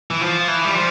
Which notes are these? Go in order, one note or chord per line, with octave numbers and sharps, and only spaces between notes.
E3
F3
E3
G3
F3